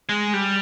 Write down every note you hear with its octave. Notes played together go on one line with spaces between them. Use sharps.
G#3
G3